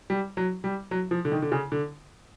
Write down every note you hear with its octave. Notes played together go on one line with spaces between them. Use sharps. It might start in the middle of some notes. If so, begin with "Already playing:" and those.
G3
F#3
G3
F#3
F3
D3
D#3
D3
C#3
D3